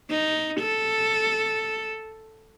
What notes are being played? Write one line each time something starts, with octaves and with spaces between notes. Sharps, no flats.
D#4
A4